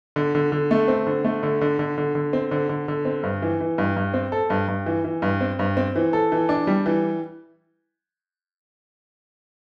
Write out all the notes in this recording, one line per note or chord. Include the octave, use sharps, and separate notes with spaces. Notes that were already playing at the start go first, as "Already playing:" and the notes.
D3
D3
D3
A3
C4
D3
A3
D3
D3
D3
D3
D3
C4
D3
D3
D3
C4
G2
E3
E3
G2
G2
C4
A4
G2
G2
E3
E3
G2
C4
G2
C4
E3
A4
E3
D4
G3
E3